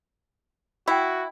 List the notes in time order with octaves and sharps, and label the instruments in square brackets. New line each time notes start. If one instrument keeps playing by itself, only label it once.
[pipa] E4 [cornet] F#4 [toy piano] G5 B5